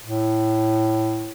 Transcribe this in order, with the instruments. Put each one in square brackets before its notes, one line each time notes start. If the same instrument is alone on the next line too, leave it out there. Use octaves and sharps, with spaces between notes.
[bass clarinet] A2